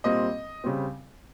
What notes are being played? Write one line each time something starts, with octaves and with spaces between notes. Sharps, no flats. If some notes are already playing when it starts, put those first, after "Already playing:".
A#2 G3 C4 D#5
C#3 G3 C4